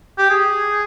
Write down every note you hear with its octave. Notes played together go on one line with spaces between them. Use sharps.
G4
G#4